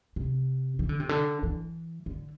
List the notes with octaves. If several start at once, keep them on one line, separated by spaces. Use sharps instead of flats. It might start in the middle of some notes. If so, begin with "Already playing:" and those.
C3
E3
D3
C3
D3
E3
D3